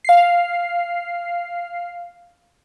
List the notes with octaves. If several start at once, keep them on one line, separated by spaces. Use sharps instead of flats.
F5 C7